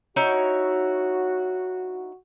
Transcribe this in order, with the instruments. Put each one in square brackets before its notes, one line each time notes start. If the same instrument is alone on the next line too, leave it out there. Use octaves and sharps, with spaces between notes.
[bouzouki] D#4 E4 C#5 [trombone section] F#4